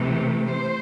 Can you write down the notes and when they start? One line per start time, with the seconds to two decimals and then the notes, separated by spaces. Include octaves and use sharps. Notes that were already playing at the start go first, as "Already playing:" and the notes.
Already playing: C3 E3 A3
0.51 C5